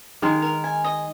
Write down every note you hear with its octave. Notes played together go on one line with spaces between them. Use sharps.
D#3 G#3 A#4
A#4
G#5
D#5